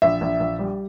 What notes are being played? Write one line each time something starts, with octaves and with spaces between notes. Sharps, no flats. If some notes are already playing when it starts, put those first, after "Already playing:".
A#1 E5
A#1
A#1
G3